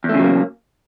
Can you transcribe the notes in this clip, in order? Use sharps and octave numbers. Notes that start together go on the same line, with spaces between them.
E2 C#3 F#3 A3 A#3